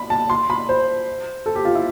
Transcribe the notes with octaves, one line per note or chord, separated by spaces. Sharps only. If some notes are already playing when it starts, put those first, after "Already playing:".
Already playing: B5
A5
C6
B5
C5
A4
G4
F4
E4